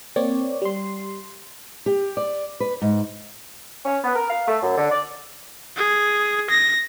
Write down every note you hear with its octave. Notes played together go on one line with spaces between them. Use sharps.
A#3 C4 C#5 D5
G3 C6
G4
D5
B4
G#2
C#4
B3
A#4
F5
A3
F#2
D3
D5
G#4
A#6